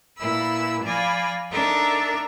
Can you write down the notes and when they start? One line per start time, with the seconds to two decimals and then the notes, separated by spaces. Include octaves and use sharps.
0.17 A#2 E4 B4 B5 E6
0.82 F3 D5 F5 G#5 B5 A#6
1.51 D4 D#4 A4 A#4 E5 A#5